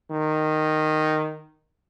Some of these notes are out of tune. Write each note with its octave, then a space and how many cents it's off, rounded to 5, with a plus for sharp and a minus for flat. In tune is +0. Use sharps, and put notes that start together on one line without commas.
D#3 -10